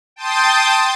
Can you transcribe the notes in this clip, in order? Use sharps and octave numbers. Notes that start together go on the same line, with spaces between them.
G5 A5 C6 D#6 G6 A6